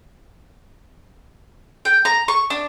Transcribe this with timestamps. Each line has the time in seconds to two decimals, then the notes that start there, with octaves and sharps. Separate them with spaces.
1.85 G5
2.05 A#5
2.28 C#6
2.50 D4